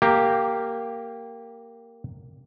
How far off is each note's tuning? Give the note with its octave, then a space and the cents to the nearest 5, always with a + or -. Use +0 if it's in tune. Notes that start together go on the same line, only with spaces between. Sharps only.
A#3 -10 G4 +0